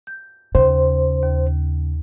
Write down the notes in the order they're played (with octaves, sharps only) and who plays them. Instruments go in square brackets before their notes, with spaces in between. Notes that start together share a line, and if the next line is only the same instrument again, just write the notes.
[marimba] G6
[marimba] D#2 [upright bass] C#3 [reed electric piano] C5
[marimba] D#2